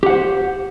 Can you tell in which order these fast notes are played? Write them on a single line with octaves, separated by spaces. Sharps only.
G4 F#5 C5